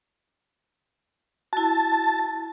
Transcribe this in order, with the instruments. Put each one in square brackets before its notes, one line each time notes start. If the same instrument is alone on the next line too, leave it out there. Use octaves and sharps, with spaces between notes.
[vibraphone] E4 F#4 [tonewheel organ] A5